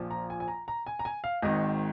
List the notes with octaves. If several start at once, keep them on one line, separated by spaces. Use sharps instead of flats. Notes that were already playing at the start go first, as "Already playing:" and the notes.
Already playing: A#1 A#2 F3
A#5
G#5
G#5
A#5
A#5
G#5
A#5
G#5
F5
G#1 G#2 D#3 D#5